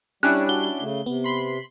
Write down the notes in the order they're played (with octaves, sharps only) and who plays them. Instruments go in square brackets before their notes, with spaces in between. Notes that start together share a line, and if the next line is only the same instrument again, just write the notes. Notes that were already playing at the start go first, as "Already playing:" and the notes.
[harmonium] G3 [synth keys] C#4 D4 E4 [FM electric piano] G4 [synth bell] F#6
[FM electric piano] F#4 [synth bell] G7
[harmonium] C#3 A3
[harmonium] C3 [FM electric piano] B3
[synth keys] B5 C6